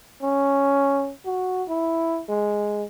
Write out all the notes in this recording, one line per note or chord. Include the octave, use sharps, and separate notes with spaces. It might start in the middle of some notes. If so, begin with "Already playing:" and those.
C#4
F#4
E4
G#3